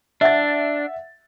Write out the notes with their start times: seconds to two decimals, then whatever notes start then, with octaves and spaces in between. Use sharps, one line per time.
0.21 D4 E5 F#5 A6